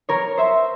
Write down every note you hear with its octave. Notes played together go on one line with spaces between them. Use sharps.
A#4 C#5
C5 E5